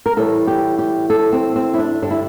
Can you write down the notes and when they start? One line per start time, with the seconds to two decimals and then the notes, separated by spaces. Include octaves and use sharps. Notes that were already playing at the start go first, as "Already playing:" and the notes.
0.06 A#4
0.17 A2 E3 G3 A4
0.47 G4
0.79 G4
1.10 A4
1.32 C4
1.56 C4
1.74 E4
1.78 D4
2.02 G2 D3 G3 D4
2.11 E4